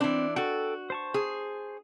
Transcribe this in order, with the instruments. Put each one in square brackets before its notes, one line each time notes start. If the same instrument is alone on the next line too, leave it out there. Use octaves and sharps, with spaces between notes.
[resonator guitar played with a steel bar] E3 D4 [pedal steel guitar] C4
[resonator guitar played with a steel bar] F#4 [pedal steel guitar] A4 G5
[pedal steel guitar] C5 A5 C#6
[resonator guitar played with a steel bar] G#4